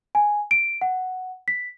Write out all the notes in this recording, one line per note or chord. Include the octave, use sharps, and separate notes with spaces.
G#5
D7
F#5
B6